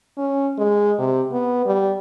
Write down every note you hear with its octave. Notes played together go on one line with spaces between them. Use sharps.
C#4
G#3
C3
B3
G3